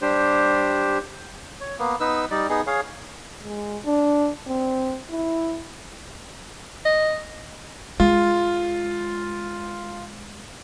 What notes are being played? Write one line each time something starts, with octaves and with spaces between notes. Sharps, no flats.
G3 D4 G4 C5
C#5
A#3 B3
B3 D#4 B4 E6
G3 D#4 D5
B3 D#4 G#4
G#4 C#5 F5
G#3
D4
C4
E4
D#5
G#3 F4